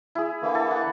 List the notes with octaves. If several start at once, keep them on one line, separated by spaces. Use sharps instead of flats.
E4 G#4
D3 E3 A#3
A4
F#5